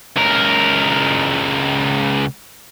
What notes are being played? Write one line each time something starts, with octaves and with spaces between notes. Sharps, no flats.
C#2 A#4